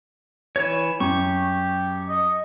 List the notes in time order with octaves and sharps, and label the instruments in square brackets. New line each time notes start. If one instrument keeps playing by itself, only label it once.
[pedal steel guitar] E3 C#5
[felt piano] F#2 [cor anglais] G4 [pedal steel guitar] C#6
[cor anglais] D#5